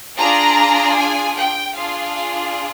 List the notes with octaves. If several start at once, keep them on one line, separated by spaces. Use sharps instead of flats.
D4 F4 G#4 A#5
G#5
G5
D4 F4 G#4 F5